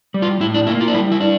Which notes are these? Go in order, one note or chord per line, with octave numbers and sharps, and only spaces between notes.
G3
F4
A2 E4
D4
A#3 E4
F4
D4
G3 E4
E4
D4